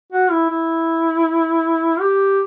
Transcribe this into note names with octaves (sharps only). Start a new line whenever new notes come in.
F#4
E4
E4
G4